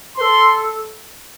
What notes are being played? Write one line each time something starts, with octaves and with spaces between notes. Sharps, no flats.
A4 C5 C6